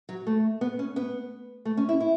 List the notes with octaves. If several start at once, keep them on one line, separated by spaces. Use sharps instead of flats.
F#3
A3
B3
C#4
B3
A3
C#4
E4
E4